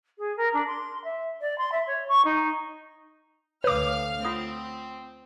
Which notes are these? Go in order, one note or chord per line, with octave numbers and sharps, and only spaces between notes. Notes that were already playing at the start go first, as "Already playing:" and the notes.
G#4
A#4
D4
C6
E5
D5
C6
E5
C#5
C#6
D#4
D2 B4 C#5 F5 D6 F6
C4 F4 F#5 D#6